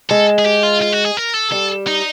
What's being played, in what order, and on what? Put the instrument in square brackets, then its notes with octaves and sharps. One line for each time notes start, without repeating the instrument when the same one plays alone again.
[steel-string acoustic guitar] G#3 [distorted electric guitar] A4
[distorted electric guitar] G#4
G4
F4
F4
F#4
G#4
A#4
A4
[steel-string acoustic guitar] G3 [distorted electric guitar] A4
[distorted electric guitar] D#4